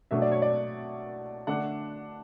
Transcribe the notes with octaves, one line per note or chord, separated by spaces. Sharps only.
B2 F#3 A3 D4 E5
D5
C#5
D5
D3 A3 D4 F#5